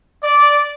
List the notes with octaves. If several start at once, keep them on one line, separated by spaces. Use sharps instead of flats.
D5